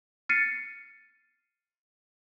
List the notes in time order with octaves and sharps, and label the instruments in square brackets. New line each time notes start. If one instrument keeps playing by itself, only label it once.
[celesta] F6 A6 C7 C#7 D#7